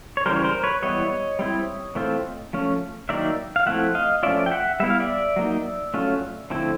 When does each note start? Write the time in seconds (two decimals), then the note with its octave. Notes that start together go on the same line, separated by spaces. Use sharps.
0.17 C#5
0.26 C#3 E3 G3 A#4 C5
0.36 C#5
0.44 A#4 C5
0.64 B4 C#5
0.82 E3 G3 B3 E4 C#5 D#5
1.39 G3 C4 E4
1.95 E3 A3 C4 F4
2.53 F3 A3 C#4
3.09 D#3 F#3 A#3 D#4 D5 E5
3.56 F5
3.66 F3 A3 C4 E4 E5 F#5
3.95 D#5 F5
4.23 F3 A3 C#4 F4 D5 E5
4.46 G5
4.51 E5 F#5
4.80 G3 B3 E4 E5
4.90 F5
5.00 D5 E5
5.36 F#3 A#3 D#4
5.94 F#3 A3 C#4 F4
6.50 D3 F3 A3 C4 E4